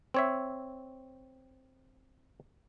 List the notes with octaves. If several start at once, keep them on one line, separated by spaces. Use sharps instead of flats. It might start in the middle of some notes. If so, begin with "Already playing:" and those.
C4 C#5 E5